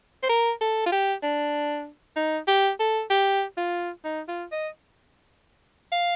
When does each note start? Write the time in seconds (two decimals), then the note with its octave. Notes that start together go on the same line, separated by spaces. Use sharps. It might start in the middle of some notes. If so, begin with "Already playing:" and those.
0.23 C5
0.29 A#4
0.61 A4
0.86 F4
0.92 G4
1.23 D4
2.16 D#4
2.48 G4
2.80 A4
3.10 G4
3.57 F4
4.04 D#4
4.28 F4
4.52 D#5
5.92 F5